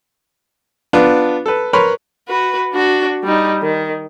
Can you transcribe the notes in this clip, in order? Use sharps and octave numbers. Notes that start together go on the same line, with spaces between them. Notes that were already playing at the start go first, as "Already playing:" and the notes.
B3 D4 F4 B4
A4 B4
A#4 B4 C#5 B5 C6
F#4 B4
D4 F#4
G3 D#4
D#3